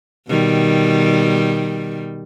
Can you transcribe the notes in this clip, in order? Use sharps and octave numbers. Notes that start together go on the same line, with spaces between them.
B2 D#3 G3